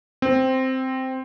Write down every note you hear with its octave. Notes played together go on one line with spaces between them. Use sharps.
C4